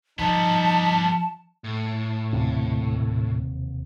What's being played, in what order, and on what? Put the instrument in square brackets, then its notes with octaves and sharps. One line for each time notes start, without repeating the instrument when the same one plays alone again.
[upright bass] F3 [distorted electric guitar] G3 B3 [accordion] D#4 [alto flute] A5
[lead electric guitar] A2
[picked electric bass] E1 D#2 C3